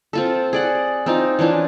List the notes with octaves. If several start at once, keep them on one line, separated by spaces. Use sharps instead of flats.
C4 F4 A4
G#4 D5 F#5
C4 D#4 F4
E3 C#4 D4 F4